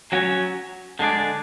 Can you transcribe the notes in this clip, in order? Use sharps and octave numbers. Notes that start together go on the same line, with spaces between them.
F#3 C#4 F#4 C#5
D3 G#3 D4 G#4 D5